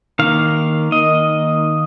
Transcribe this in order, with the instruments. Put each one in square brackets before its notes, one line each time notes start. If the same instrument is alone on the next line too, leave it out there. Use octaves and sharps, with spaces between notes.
[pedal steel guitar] D#3 A#3 F5
D#5